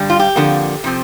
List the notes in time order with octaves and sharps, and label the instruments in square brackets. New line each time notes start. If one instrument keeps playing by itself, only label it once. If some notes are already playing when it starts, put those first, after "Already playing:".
Already playing: [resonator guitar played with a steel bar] G2 D3 G3
F4
G4
F2 D3 F3 A#3
C3 F3 C4